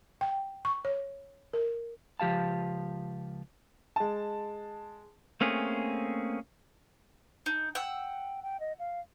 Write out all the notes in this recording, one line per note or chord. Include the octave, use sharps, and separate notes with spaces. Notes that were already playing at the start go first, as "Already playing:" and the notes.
G5
C#6
C#5
A#4
C#2 F3 G4 F5 A5
G#3 A5
A3 A#3 C4 C#4 G#4
D#4
F#5 G5 E6
G5
D#5
F5